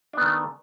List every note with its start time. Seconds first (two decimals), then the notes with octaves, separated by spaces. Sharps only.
0.13 D4
0.17 B3
0.21 D#3
0.25 A3